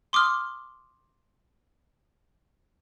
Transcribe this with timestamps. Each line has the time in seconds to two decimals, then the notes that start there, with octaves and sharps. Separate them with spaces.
0.13 C6 D6 D#6 F6